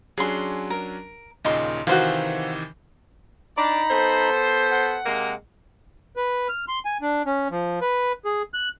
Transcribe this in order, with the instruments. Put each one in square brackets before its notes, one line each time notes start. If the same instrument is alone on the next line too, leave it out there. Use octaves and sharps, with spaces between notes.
[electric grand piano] F#3 C#4 D4 [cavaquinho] G#4 C6
[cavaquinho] A#4
[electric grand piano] D#2 A#2 C#3 [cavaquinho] D#4 C6
[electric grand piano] C3 D#3 E3 [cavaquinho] F#4 C5 F5
[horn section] D4 D5 [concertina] D#4 A#5 B5
[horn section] B3 A4 C5
[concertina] F#5
[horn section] C3 G#3 A#3
[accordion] B4
F6
C6
G#5
D4
C#4
F3
B4
G#4
F#6